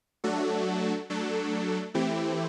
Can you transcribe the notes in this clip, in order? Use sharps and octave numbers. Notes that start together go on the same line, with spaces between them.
F#3 A3 D4 F#4 A4
F#3 A3 D4 A4
E3 A3 C4 E4 G4